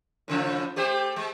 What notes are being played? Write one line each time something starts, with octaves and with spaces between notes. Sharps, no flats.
A2 C#3 F3
A3 G4 C5
G#3